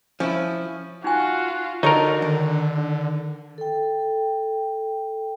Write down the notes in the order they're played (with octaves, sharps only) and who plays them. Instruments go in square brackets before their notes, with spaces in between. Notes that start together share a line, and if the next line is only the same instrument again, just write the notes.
[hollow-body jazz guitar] F3 [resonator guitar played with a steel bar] C#4 E4
[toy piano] D#4 G#5 [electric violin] F4 [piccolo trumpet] F#4
[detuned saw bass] D3 [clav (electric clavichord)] D#4 A#4 [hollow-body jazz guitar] F#4 A4 C#5
[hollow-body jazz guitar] D#3
[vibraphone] A4 G5